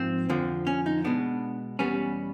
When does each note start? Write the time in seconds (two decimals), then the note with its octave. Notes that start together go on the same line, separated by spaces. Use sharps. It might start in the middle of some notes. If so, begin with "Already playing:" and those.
Already playing: G#2 F3 A#3 C4
0.30 F2 D3 F3
0.67 C#4
0.86 D#4
1.05 B2 G#3 B3 D4
1.79 E2 B2 G3 B3 C#4